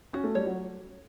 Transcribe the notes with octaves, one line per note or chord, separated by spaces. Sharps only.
C#4 F#4
A3
G3 C#5
F#3